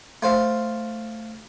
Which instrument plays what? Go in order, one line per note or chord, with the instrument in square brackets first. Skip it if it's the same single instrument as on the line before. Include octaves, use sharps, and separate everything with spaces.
[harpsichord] A3 C5 F5